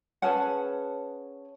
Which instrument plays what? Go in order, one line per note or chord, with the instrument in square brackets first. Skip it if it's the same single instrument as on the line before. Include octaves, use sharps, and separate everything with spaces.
[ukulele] C#4 G#4 B4 F#5 A5